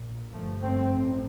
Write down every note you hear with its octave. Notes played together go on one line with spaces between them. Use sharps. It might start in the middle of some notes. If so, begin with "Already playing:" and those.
Already playing: A#1 A#2
G1 G2 F3 A3
A3 C4
A1 A2